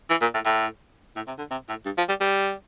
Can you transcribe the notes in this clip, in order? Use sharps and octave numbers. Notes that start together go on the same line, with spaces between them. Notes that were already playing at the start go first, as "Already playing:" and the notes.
E3
A#2
A2
A2
A2
C3
D3
C3
A2
G2
F3
G3
G3